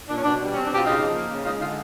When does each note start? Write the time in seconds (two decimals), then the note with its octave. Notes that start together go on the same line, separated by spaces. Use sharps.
0.09 A#2 D4
0.17 C#4
0.24 B2 D4
0.39 G3
0.54 C4 C#4
0.65 D4
0.70 B2 F4 G4
0.85 C#3 D#4 F4
1.00 F3
1.15 A#3
1.30 C#3
1.45 G#3 D#4 F4
1.60 D3 D#4 F4